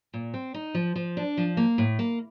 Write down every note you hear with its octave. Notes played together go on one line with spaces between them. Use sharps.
A#2
C4
D#4
F3
F3
D4
F3
A#3
A2
A#3